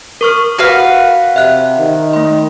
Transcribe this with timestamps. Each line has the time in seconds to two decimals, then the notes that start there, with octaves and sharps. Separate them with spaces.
0.21 A#4 C#6 F6
0.58 F#4 B4 F5
1.36 C3 E5 F#6
1.79 D#3
2.13 A3 C6